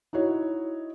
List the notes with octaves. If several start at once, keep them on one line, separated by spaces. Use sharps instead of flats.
D#4 E4 F#4 C#5